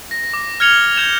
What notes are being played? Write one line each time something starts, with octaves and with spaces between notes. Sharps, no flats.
A#6
D6
F6 G#6 C#7 F7 G7
G6 G#6 E7